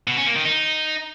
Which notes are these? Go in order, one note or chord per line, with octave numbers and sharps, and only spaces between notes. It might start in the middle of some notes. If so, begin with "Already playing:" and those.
B2
C#4
A#3
D#3
D#4